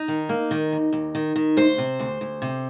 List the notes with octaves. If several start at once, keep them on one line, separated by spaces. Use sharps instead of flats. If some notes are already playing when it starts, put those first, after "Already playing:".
Already playing: D#4
D#3
A#3
D#3
D#2
D#2
D#3
D#3
D2 C5
C3
D2
D2
C3